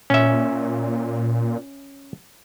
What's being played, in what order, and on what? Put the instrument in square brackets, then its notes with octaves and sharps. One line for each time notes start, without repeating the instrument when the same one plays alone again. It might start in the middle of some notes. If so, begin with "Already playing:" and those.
[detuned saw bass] A#2 [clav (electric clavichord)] C#4 E5